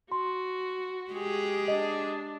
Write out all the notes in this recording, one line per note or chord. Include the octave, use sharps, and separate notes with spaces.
F#4 C6
G#3 G4 G#4
D4 D#5